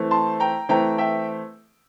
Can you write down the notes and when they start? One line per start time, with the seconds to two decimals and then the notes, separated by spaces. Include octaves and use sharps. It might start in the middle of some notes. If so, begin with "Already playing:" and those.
Already playing: E3 A3 C4
0.11 A5 C6
0.40 G5 A#5
0.69 E3 A3 C4 G5 A#5
0.98 E5 G5